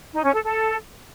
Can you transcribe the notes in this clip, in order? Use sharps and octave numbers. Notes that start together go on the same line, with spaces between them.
D#4
C#4
A4
A4